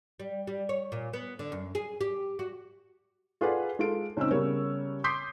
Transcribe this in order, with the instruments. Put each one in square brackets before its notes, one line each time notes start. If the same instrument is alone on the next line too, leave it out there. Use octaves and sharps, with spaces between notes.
[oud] G3
G3
C#5
A#2
B3
D3
F#2
G#4
G4
F#4
[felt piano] F4 G#4 A4 B4 D5 F#5
G#3 F4 A4 D7
C#2 C4 C#4 D#4 E6
C#3 G3 B3 A#4 C#5
C6 D6 D#6 G6 B6 C7